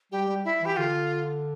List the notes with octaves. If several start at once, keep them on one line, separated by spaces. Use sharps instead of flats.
G3 G4
G3
E4
E3 G4
D3 F4